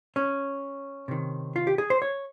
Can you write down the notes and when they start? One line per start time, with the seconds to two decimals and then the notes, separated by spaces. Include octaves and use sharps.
0.16 C#4
1.08 C3 D#3
1.56 F4
1.67 G4
1.78 G#4
1.90 C5
2.02 C#5